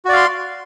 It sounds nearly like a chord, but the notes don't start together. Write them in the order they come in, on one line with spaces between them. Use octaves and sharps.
F#4 D5 F5 C6